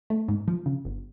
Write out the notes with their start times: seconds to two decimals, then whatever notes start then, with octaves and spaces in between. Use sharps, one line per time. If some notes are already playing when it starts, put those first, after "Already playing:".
0.10 A3
0.28 G#2
0.48 F3
0.66 C#3
0.85 G1